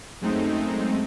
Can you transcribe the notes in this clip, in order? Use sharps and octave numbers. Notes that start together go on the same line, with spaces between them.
F#2 G#3 A3 C4 D#4